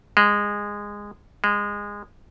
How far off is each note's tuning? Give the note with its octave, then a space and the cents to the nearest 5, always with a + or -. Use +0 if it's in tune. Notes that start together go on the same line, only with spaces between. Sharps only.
G#3 -15
G#3 -20